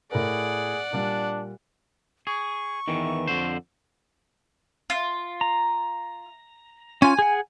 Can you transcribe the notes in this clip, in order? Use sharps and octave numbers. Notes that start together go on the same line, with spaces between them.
A2 G#4 A#4 D5 F#5
A#2 G3 D4
G#4 C#6
E2 D#3 E3
F2 D3 C5
F4
A#5
C#4 F4 G#5
G#4 F#5